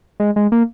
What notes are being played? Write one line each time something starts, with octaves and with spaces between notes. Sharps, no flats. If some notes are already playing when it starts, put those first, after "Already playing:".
G#3
G#3
A#3